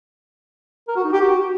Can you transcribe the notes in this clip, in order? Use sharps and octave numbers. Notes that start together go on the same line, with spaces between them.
A#4
F#4
D#4
G4
F#4